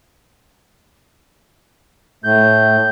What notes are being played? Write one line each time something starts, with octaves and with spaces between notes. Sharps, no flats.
A2 A3 G6